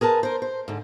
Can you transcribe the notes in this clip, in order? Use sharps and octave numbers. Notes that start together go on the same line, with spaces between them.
G#4 A#4 B4 A5
A#4 C5
C5
G#2 D3